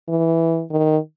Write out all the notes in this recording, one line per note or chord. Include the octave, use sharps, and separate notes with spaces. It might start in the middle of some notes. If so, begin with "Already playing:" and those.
E3
D#3